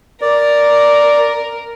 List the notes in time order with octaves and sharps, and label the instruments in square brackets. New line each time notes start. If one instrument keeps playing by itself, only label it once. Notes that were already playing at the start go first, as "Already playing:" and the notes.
[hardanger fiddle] A#4 [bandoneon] D5